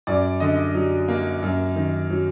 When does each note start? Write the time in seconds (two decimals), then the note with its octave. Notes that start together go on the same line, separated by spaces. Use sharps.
0.07 F#2 D5
0.40 D3 D#5
0.75 F#3
1.08 A#3
1.43 F#2
1.76 D#3
2.11 F#3